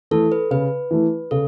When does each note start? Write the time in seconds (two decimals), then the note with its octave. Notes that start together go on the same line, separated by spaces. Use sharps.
0.11 E3 A3 E4 A4
0.32 B4
0.51 C#3 B4
0.91 E3 A3 E4
1.31 C#3 A4